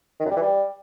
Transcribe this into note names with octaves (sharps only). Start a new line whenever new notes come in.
D#3
F#2
G3
E3
G3